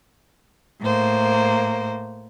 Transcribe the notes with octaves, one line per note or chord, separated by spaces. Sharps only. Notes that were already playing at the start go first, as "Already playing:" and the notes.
A2 A#3 C5